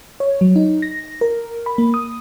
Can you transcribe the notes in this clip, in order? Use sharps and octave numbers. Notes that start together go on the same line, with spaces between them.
C#5
F#3
D#4
A#6
A#4
B5
A#3
D#6